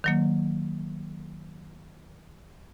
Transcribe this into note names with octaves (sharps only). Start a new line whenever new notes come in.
D#3 F#3 A#3